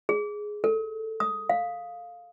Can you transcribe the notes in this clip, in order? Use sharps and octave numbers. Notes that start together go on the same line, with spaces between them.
G#4
A4
D#6
F5